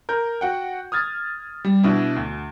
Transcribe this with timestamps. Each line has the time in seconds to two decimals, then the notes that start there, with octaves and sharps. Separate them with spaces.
0.09 A#4 G6
0.41 F#4 F#5 G5
0.92 D#6 F6 G#6 A6
1.65 G3
1.83 B2 D4 E4
2.16 D2